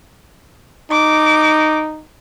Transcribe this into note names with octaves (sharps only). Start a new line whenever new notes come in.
D#4 D6